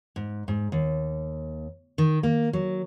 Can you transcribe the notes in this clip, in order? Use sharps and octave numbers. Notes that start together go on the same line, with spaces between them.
G#2
G#2
D#2
D#3
A#3
F#3